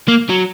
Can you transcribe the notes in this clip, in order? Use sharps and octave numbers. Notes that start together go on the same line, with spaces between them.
A#3
F#3